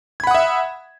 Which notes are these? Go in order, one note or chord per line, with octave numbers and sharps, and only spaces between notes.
E5 F#5 B5 D#6 G#6